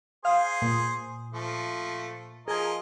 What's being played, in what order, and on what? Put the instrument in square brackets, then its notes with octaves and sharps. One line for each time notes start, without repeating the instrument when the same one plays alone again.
[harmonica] G#4 C5 D#6 [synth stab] F5
[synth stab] A#2
[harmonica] F3 A3
[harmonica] F3 A#4 D#5 [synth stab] G#4 G#5